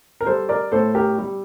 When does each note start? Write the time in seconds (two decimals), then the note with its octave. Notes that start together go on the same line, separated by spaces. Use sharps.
0.21 A#4
0.26 G3 A4 C5
0.49 A#4 D5
0.72 A2 A4 C5
0.95 G4 A#4
1.18 G3